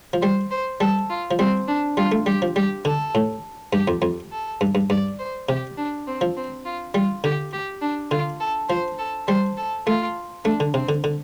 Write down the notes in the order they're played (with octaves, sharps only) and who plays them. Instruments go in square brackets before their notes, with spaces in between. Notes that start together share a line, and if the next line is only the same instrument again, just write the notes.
[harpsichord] F3
[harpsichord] G3 [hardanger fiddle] C5
[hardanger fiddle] C5
[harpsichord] G3 [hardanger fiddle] A4
[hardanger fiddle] F4
[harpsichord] F3
[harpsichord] G3 [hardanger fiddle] C4
[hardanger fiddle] D4
[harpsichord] G3 [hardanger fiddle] F4
[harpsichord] A3
[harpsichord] G3 [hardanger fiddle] G4
[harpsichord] F3
[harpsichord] G3 [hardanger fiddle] G4
[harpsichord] D3 [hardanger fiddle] A4
[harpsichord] A2
[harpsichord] G2 [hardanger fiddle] G4
[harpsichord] F2
F2
[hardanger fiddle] A4
[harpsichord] G2
G2
[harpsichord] G2 [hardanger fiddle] D5
[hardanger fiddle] C5
[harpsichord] C3 [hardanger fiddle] G4
[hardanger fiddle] D4
C4
[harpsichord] F3
[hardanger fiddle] C4
F4
[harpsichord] G3 [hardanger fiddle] F4
[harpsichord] D3 [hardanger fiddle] G4
[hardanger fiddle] G4
D4
[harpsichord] D3 [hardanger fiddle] F4
[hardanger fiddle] A4
[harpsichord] F3 [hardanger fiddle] C5
[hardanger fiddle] A4
[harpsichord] G3 [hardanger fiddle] C5
[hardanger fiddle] A4
[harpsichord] A3 [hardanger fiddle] F4
[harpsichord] A3 [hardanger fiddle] D4
[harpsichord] D3
[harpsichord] C3 [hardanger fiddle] C4
[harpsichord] D3
D3